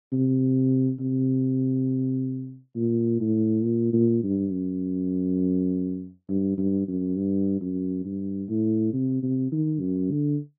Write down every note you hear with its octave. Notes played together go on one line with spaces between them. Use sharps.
C3
C3
A#2
A2
A#2
A#2
G2
F#2
G2
G2
F#2
G2
F#2
G2
A2
C3
C3
D#3
F#2
D3